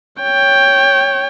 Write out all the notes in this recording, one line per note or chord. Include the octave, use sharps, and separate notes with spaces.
C#5 G5